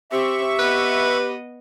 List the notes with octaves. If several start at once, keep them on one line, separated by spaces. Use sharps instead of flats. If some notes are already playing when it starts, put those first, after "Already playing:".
C4 G4 E5 C#6
B3 B4 D#5